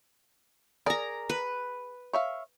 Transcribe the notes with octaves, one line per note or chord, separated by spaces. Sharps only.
G#4 A#4 D5 A#5
B4
C#5 E5 F5